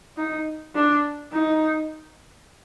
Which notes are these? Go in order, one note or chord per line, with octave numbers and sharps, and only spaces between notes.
D#4
D4
D#4